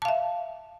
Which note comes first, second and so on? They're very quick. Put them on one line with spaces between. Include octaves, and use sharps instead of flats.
A5 F5 E5